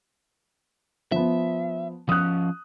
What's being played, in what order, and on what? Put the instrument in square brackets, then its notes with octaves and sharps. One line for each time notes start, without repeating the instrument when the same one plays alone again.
[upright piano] F3 B3 [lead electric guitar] E5
[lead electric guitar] F3 C#4 [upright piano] D#6 F#6